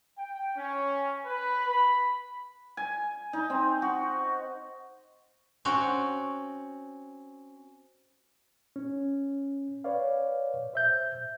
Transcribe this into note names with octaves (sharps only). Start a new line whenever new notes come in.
G5
C#4
B4
B5
G#5
D#4
C4
F#4
C4 C#4 F#4
C#4
B4 C#5 D5 F5
C5 E5 G6